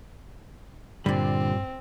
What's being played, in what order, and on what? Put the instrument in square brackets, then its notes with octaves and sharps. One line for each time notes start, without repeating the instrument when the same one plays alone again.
[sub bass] G2 [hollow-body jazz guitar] A#2 G3 [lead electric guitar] D3 [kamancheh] C4